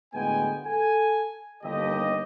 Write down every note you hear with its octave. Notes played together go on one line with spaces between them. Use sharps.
D2 A2 G#3 B3 G5 G#5
A4 G#5
G1 D#2 G4 D#5